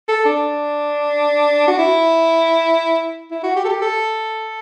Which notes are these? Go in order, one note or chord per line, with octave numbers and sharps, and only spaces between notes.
A4
D4
F#4
E4
E4
F#4
G4
A4
G4
A4